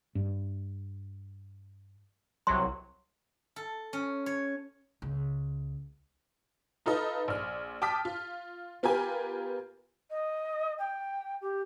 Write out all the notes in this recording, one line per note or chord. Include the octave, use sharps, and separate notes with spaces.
G2
C2 F#3 C6
A4
C#4
C#5
C#2
D#4 F4 A4 B4 D#5
A#1 F6
G5 A5 D6 D#6 F6 B6
F4
B3 F4 G4 A#4 B4 G#5
D#5
G5
G4